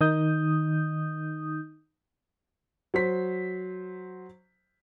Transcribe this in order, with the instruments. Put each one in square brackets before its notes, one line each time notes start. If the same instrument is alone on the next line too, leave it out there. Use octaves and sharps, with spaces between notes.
[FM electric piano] D#3 D#4 D#6 G6
[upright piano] F#3 C5 B6